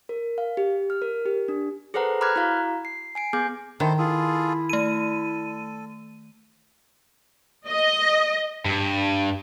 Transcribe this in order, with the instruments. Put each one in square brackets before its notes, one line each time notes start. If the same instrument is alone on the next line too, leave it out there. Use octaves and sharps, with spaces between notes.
[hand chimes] A#4
F5
G4
F6
A#4
G4
D4
G#4 A4 B4 C5 F#5 A#5
A#5 B5 D6 F6 F#6 G#6
E4 F#4 F5 A#5
C7
G#5 C7 D7
B3 G#4 G#5 D6 G6
[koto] D#3 [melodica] E4 A4 C5
[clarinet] E4 [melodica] F4 G#4 A4
[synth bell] A3 D#7 [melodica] A4
[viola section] D#5
[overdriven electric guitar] G2